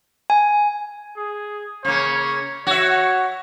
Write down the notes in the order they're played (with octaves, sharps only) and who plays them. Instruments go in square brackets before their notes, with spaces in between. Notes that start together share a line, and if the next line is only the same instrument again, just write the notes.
[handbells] G#5
[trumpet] G#4
[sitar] C#3 A#3 [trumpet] C#5
[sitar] F#4 E5 [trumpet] C#5